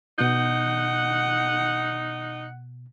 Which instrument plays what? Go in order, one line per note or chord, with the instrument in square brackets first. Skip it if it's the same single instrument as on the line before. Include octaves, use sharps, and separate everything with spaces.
[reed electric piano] B2 G6 [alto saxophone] D#4 [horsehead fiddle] F#5